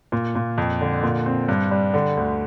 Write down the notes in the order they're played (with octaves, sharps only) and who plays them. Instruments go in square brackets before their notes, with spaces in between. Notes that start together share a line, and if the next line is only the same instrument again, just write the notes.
[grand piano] A#2
A#2
F2
D3
A#2
C4
G2
G3
D3
D2